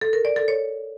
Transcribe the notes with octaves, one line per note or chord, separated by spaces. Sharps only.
A4
A#4
D5
A4
C#5